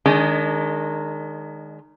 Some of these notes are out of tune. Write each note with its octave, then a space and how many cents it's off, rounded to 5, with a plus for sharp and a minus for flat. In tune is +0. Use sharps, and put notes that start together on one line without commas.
D#3 -20 G#3 +0 D4 -40